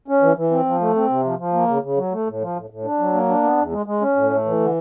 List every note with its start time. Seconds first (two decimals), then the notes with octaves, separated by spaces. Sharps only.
0.08 C#4
0.22 E3
0.37 E3
0.51 C4
0.66 F3
0.81 A3
0.96 C4
1.09 C3
1.24 F3
1.39 F3
1.53 A#3
1.68 C#3
1.83 C#3
1.97 F#3
2.12 A3
2.27 A2
2.41 F3
2.56 A2
2.70 A2
2.85 D4
2.99 F#3
3.13 A#3
3.28 D4
3.44 B3
3.57 E2
3.72 G#3
3.86 G#3
4.01 C#4
4.16 A2
4.30 A3
4.45 E3
4.60 D3